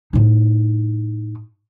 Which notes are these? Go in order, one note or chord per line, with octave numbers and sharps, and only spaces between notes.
A2 D#4